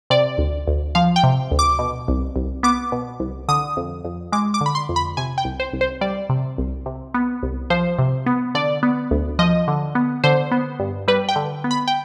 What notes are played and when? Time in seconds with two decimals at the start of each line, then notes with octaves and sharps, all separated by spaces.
0.10 C3 D5
0.38 D2
0.68 D2
0.95 F3 F5
1.16 G5
1.23 C3
1.51 D2
1.59 D6
1.79 B2
2.08 C2
2.36 C2
2.63 B3 D6
2.92 B2
3.20 C2
3.48 D3 D#6
3.77 F2
4.04 F2
4.32 G#3 D6
4.54 D6
4.61 D3
4.66 B5
4.75 C6
4.89 F2
4.96 B5
5.17 C3 G#5
5.38 G5
5.45 C2
5.60 C5
5.73 C2
5.81 C5
6.01 G3 D5
6.29 C3
6.58 C2
6.86 C3
7.14 B3
7.43 C2
7.70 F3 C5
7.99 C3
8.26 B3
8.55 D3 D5
8.83 B3
9.11 D2
9.39 F3 D#5
9.68 D3
9.95 B3
10.24 D3 C5
10.51 B3
10.80 G2
11.08 G3 B4
11.29 G5
11.36 D3
11.64 B3
11.71 B5
11.88 G5